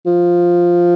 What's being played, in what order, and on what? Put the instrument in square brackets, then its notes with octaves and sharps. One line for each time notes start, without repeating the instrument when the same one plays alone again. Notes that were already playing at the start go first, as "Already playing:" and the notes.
[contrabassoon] F3